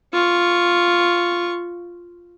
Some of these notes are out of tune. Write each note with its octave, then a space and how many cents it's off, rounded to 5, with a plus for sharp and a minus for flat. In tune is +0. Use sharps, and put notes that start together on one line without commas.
F4 +0 C#6 +0